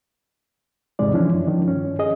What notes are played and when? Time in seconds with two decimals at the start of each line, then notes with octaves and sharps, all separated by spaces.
0.99 E2 G#2 C3 G#3 D5
1.13 E3 F3 C#4 D4 E4
1.33 F#2
1.47 D#3 F3
1.68 G2 C#4
1.99 G#4 D#5